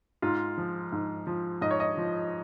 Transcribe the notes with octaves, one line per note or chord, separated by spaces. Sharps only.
G#2 F4
F3
G#2
F3
G#2 D#5
C#5
D#5
F3